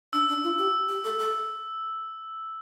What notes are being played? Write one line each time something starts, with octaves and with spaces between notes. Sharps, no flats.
D4 E6
D4
F4
G4
G4
A4
A4